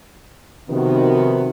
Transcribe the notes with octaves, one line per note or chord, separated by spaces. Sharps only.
C3 D#3 F3 B3 F#4